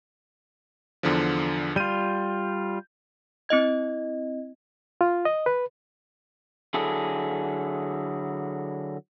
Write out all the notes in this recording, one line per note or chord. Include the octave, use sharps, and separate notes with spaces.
E2 D3 F3
G3 F4 G6 D#7
C4 E4 D#5 G#6
F4
D#5
B4
D3 F#3 E4 G#4 A4